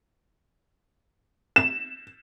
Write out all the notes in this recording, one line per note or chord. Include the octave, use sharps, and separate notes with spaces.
E7